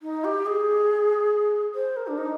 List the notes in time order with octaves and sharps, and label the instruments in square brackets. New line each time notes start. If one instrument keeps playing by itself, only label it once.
[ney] D#4
G4
G#4
C5
A#4
D4
D#4